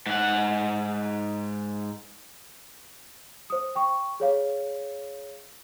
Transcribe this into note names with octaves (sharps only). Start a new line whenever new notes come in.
G#2 F#5
C5 D#6
G5 C#6
G#4 C#5 F5